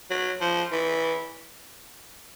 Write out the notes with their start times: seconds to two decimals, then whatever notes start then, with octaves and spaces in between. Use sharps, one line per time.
0.11 F#3
0.41 F3
0.72 E3